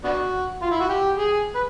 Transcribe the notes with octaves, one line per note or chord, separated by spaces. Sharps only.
B3 D4 F#4
F4
E4
F#4
G4
G#4
B4